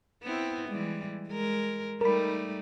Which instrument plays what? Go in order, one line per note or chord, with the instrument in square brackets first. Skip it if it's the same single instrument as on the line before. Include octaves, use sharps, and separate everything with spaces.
[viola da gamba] B3 C4 E4
E3 G3 G#3
G#3 A#4
[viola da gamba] G3 A3 D#4 [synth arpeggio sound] A#4 B5